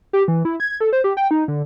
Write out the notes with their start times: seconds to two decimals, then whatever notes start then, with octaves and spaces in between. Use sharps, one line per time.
0.13 G4
0.28 E3
0.45 E4
0.60 G#6
0.81 A4
0.93 C5
1.04 G4
1.17 G5
1.31 D#4
1.48 D3